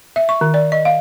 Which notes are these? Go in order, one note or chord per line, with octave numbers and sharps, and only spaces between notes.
E5
C#6
D#3
D5
D#5
F5